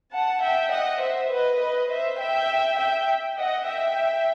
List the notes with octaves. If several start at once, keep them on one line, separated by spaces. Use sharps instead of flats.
F#5 A5
E5 G5
D#5 F#5
C5 E5
B4 D#5
B4 D#5
C5 E5
E5 G5
E5 G5
D#5 F#5
E5 G5